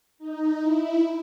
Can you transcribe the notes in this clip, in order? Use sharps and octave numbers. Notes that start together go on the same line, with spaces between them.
D#4
E4